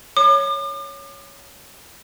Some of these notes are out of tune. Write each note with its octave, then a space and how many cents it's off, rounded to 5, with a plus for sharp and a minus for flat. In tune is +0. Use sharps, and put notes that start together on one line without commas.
C#5 +0 D6 +40